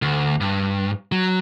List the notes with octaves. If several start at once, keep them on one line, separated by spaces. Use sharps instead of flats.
D2
G2
F#3